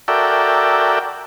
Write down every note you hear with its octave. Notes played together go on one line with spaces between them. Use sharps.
F#4 A4 A#4 D5 E5 G5